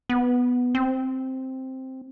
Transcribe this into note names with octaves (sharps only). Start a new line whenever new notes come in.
B3
C4